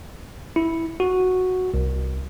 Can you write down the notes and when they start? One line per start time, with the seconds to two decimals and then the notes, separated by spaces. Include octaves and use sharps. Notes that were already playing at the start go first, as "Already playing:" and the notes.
0.56 E4
1.00 F#4
1.74 C2